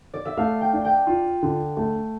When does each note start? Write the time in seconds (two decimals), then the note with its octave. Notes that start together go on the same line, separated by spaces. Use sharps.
0.14 D5
0.25 E5
0.37 A3 F5
0.61 G5
0.73 D4
0.85 G5
1.07 F4
1.43 D3
1.77 A3